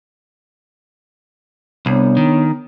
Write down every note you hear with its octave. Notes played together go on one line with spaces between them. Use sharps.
C2 B3 D4 C#5
D#3